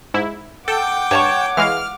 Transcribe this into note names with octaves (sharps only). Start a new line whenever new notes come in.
G#2 E4
A4 F#5 G5 D6
G2 C#5 A5 C#6
E3 G#3 F5 F6